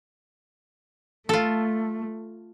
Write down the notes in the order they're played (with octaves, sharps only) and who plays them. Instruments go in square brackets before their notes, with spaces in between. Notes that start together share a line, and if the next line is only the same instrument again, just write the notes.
[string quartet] A3 [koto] F4 A4